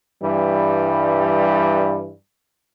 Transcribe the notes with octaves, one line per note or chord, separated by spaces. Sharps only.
G2 E3 G3